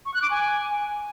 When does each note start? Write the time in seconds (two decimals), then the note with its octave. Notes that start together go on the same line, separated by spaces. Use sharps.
0.06 C#6
0.14 F#6
0.22 D6
0.31 G#5